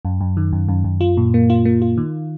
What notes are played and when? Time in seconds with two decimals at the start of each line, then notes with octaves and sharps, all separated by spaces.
0.05 F#2
0.21 F#2
0.37 D#3
0.52 F#2
0.68 F#2
0.84 F#2
1.01 F4
1.17 A#2
1.34 A#3
1.50 F4
1.65 A#3
1.82 F4
1.98 D#3